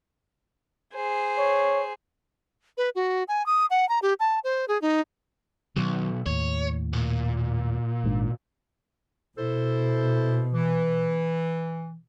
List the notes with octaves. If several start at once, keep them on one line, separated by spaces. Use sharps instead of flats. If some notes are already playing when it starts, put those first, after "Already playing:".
G#4 C5
C#5
B4
F#4
G#5
D#6
F#5
A#5
G4
A5
C5
G#4
D#4
B1 B2 D#3 F#3
D#2 A2 C#5
A#2
G#1 G#2 D4
B2 E4 A4 C5
E3